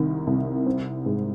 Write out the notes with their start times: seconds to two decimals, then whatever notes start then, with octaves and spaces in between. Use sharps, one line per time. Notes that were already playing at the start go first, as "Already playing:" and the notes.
Already playing: C2 D#3
0.27 C2
0.66 C4
1.06 G#2